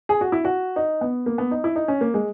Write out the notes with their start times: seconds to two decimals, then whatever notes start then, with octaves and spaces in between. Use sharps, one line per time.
0.09 G#4
0.21 F#4
0.32 E4
0.45 F#4
0.76 D#4
1.01 B3
1.26 A#3
1.38 B3
1.51 D#4
1.64 E4
1.76 D#4
1.88 C#4
2.01 A#3
2.14 G#3